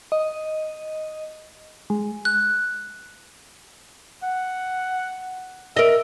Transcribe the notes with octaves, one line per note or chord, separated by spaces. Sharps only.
D#5
G#3
F#6
F#5
A#4 D#5 E5